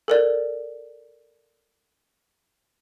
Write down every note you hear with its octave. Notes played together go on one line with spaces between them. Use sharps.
A4 A#4 D5